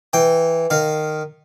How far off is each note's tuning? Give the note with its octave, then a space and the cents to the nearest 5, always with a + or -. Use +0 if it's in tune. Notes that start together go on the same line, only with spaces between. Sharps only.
E3 +0 G5 +0
D#3 -15 F5 +0